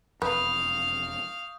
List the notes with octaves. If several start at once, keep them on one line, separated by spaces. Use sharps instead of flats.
E1 F2 B4 F5 C#6 D#6 G6